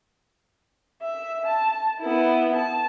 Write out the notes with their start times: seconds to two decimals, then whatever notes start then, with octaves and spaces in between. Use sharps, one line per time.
1.02 E5
1.46 A5
2.00 B3 E4
2.55 A5